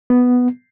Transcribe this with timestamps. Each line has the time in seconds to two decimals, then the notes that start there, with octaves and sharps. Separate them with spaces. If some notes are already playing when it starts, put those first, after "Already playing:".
0.10 B3